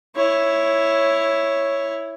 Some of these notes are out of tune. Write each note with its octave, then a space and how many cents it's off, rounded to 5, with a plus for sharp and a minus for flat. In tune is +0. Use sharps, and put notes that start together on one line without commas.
E4 +0 C#5 +0